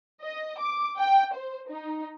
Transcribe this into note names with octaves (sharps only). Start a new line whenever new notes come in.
D#5
D6
G5
C5
D#4